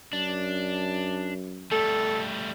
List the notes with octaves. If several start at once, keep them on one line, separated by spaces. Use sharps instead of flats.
F#2 D4
G3 A3 A4